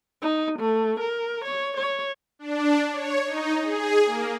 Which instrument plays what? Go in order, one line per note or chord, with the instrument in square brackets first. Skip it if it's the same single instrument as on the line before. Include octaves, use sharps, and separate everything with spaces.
[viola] D#4
A3
A#4
C#5
C#5
[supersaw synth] D4
C#5
D#4
G#4
A#3